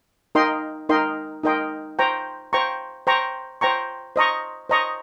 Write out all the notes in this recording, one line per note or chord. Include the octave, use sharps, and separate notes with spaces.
D#4 A#4 D#5 G5 C6
D#4 A#4 D#5 G5 C6
D#4 A#4 D#5 G5 C6
C5 G5 A#5 C#6
C5 G5 A#5 C#6
C5 G5 A#5 C#6
C5 G5 A#5 C#6
C5 D#5 A#5 C#6
C5 D#5 A#5 C#6